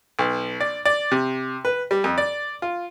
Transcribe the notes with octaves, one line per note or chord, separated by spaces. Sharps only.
B1
D5
D5
C3
B4
G3
F2
D5
F4